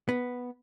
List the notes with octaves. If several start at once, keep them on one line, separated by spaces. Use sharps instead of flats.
B3